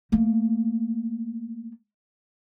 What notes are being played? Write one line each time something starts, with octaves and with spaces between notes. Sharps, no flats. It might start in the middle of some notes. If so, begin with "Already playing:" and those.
A3 A#3